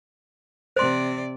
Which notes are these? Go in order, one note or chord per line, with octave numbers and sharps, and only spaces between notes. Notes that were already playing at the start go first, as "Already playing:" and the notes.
C3 C5 D5 C6